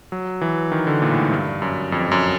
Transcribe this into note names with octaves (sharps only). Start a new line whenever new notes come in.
F#3
E3
D#3
D3
A#2
A2
G#2
G2
F#2
F2
F#2